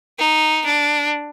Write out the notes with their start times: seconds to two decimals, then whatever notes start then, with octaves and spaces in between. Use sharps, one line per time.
0.19 D#4
0.66 D4